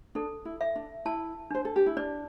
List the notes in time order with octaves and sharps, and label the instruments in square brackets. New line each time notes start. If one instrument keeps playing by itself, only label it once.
[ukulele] D4 [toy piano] A4
[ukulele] E4
[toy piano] E5
[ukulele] D4
[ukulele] E4 [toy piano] A5
[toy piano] D4 [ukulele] C5
[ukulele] A4
G4
E4
[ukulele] D4 [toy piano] D5